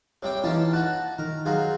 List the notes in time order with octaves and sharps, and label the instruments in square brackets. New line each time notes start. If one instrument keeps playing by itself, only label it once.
[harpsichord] C3 G3 G5 [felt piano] C#5
[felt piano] E3 D#4 [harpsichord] C#4 F4 A5
[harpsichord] F#4 A5 [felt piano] F#6
[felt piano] D#3 [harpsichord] A#4
[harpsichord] F#3 D#4 F4 [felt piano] G#4